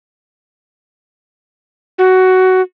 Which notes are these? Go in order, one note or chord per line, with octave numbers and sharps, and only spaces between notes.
F#4